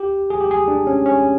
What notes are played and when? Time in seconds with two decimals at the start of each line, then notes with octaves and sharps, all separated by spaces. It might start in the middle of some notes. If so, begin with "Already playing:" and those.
Already playing: G4
0.30 G#4
0.41 G4
0.51 G#4
0.68 D4
0.87 C#4
1.06 C#4